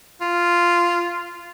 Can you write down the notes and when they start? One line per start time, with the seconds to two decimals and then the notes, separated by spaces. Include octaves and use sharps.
0.21 F4